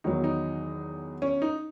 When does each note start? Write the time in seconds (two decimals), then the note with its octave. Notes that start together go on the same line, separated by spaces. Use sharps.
0.04 E2 D#3 F#3 D#4
0.24 D#4
1.22 C#4
1.42 D#4